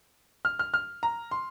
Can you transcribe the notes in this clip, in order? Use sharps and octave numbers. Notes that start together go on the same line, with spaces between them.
F6
F6
F6
A#5
C6